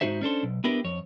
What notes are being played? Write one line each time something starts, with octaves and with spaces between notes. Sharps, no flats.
G#2 E3 D#4 F#4 C5 E5
C#4 D4 A4 C5
B1
B3 D4 E4 G4 A#4 B4
F2 C#5